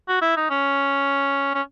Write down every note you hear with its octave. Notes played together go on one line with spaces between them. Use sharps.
F#4
E4
D#4
C#4
C#4